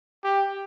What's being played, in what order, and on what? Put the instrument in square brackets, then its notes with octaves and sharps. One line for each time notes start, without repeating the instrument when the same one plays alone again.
[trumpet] G4